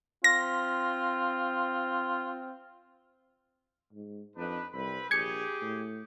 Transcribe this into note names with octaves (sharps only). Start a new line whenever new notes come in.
C4 F4 A#6
G#2
F2 D4 D#4 B4
C2 C4 B4 B5
A#1 G4 G#4 G#6 C#7
A2